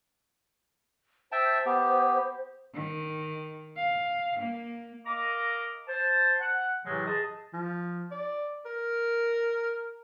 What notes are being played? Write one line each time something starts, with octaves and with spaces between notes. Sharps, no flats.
C5 E5 G5 A5
B3 G4
D#3
F5
A#3
A#4 D#5 F5 A#5 D6
C5 A5
F#5
A2 C3 E3 F#3 G#3 A3
G#4 D#5 A5
F3
D5
A#4